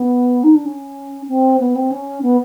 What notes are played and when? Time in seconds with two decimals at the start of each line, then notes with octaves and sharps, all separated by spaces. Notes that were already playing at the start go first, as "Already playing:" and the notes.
Already playing: B3
0.44 D#4
0.55 D4
0.65 C#4
1.28 C4
1.60 B3
1.75 C4
1.91 C#4
2.22 B3